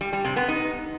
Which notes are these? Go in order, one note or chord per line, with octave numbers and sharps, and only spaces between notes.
G3
G3
C3
B3
D#4